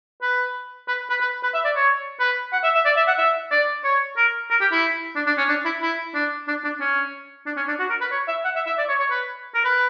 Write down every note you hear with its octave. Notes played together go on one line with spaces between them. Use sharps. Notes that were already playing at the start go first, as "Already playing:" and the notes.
B4
B4
B4
B4
B4
E5
D5
C#5
B4
F#5
E5
E5
D5
E5
F#5
E5
D5
C#5
A#4
A#4
G4
E4
D4
D4
C#4
D4
E4
E4
D4
D4
D4
C#4
D4
C#4
D4
F#4
A#4
B4
C#5
E5
F#5
E5
E5
D5
C#5
C#5
B4
A#4
B4